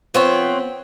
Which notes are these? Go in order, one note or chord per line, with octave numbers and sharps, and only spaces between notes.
F3 B3 C4 C#5